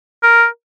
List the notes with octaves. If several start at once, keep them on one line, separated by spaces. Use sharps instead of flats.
A#4